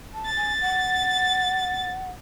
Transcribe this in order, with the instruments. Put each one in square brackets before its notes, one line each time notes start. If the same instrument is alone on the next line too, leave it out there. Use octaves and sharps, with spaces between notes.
[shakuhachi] A5
[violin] A6
[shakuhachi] G#5
F#5